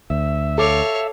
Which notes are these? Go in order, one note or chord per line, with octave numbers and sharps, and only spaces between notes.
D2 E5
A4 C#5 F5 D6